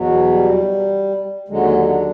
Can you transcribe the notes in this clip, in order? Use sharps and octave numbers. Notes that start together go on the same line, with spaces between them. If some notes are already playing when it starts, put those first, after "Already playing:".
Already playing: E2 B2 F#3
G3
D#2 D3 F#3 G#3
D4